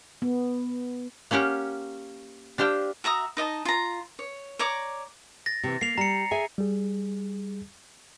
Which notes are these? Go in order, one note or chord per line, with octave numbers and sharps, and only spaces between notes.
B3
A#3 C#4 G4 F5 F#5
D4 G4 C5 F5 G5
F#4 E5 A#5 D#6
D#4 D#5 E5 A5
F4 A#5
C#5
C#5 D5 A#5 D6
A6 A#6
C3 E3
A#3 C7 F7
G3 A#5 C#7
G#4 E5 G#5
G3 G#4